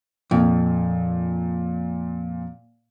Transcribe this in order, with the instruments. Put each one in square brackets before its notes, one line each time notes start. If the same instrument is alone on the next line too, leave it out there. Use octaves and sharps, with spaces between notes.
[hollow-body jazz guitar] F2 [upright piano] A#2